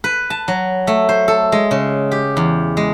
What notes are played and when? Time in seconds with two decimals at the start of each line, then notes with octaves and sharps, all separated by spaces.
0.04 B4
0.30 A5
0.48 F#3
0.87 A3
1.09 C5
1.28 A4
1.52 G#3
1.71 C#3
2.11 G4
2.37 E2
2.77 G#3